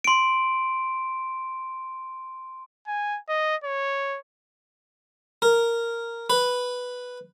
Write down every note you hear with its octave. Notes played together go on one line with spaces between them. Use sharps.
C6 D7
G#5
D#5
C#5
A#4
B4